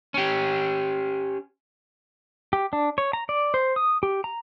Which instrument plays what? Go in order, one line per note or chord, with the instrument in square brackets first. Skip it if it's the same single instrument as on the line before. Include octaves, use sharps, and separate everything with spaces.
[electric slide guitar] C#4 G4
[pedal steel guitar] G4
D4
C#5
A#5
D5
C5
D#6
G4
A#5